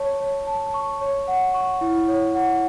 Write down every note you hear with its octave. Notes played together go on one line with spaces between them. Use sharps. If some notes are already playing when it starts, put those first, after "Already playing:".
Already playing: C#5 A5 C#6
C#5
A5
C#6
C#5
F#5
C#6
E4
C#5
F#5